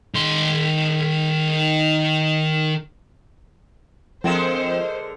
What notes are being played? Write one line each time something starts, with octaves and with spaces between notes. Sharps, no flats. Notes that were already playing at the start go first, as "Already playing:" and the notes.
D#3 C6
D3 F3 G#3 C4 A#4 C5 E7